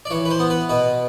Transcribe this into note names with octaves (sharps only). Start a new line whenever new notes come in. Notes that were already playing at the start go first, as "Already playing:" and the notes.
D5
E3 C#5
B4
C5
B3
B4
B2 B4